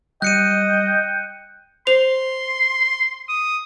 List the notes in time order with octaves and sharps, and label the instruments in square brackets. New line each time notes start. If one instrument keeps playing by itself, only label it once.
[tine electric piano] G3 [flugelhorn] D#5 [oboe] G5 [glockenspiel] F#6 C#7 D#7
[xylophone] C5 F7 [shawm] C6
[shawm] D#6